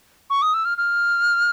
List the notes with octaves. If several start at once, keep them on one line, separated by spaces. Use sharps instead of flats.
C#6
D#6
E6
F6
F6